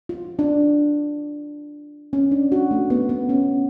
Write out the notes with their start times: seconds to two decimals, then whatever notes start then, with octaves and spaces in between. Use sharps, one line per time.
0.09 F4
0.39 D4
2.13 C#4
2.31 D4
2.52 F#4
2.71 A3
2.90 B3
3.09 B3
3.29 C#4